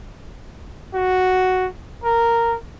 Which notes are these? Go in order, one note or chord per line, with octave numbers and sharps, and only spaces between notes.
F#4
A#4